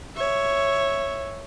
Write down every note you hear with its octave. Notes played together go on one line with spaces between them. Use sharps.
C#5 E5